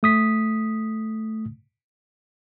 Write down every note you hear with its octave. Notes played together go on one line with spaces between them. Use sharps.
A3 D#6 B6